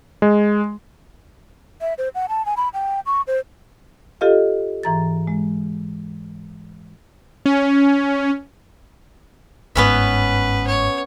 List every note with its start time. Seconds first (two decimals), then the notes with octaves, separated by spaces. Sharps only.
0.22 G#3
1.81 E5
1.98 C5
2.15 F#5
2.29 A5
2.46 G#5
2.57 B5
2.74 G5
3.06 C#6
3.27 C5
4.21 F4 G4 A4 D#5 F5
4.83 G#2 E3 A#5 A6
5.27 G#3
7.46 C#4
9.75 G1 G#2 B3 C#4 B4 E5
10.67 C#5